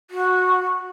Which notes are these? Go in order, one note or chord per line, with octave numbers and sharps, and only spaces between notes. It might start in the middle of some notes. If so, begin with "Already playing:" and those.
F#4